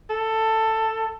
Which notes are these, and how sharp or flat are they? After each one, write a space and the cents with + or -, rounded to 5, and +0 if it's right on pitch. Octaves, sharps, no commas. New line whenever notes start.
A4 +10